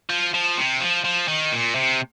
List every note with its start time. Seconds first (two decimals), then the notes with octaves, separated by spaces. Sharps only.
0.10 F3
0.34 F3
0.57 C3
0.81 F3
1.05 F3
1.28 D#3
1.52 A#2
1.75 C3